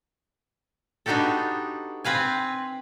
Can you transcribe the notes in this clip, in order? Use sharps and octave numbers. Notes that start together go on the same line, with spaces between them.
B3 D4 D#4 F#4 G4 A4
C4 B4 F5 G#5